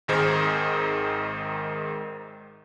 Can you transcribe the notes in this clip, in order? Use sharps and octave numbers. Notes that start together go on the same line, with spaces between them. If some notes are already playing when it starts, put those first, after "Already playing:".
G#1 G#2 D#3 G#4 A#4 C5